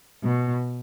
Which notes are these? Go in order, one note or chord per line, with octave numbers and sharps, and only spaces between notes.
B2